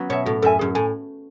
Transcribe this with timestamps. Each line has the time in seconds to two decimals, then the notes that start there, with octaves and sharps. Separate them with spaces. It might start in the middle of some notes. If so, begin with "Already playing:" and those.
Already playing: F#3 B3 C#4
0.10 B2 C#5 E5
0.26 A2 F#4
0.42 F#2 A4 E5 G#5
0.59 F#2 G#4
0.75 A2 G#5